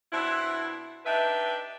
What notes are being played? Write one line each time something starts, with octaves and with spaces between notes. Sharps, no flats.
B2 C4 D4 E4
D4 D#4 G4 B4 E5